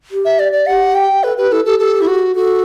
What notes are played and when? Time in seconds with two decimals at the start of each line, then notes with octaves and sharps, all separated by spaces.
0.11 G4
0.25 E5
0.39 D5
0.52 D5
0.67 G4 F#5
0.95 G5
1.23 A4 B4
1.37 G4 B4
1.51 E4 A4
1.65 G4 A4
1.79 G4 A4
2.01 E4
2.07 F#4
2.35 F#4 A4